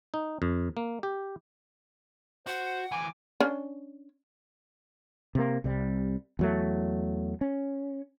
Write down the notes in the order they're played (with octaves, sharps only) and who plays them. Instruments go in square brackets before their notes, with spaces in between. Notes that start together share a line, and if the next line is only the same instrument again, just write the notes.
[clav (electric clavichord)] D#4
F2
A#3
G4
[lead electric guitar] F#4 [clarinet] C5 [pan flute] F#5
[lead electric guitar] D2 E3 [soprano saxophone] G#5 [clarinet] D6
[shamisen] C#4 D4
[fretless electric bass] C3 A#3
C2 C3 G3
E2 F#3 A3
C#4